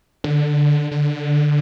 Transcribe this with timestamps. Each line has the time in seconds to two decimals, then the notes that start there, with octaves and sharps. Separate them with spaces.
0.24 D3
0.91 D3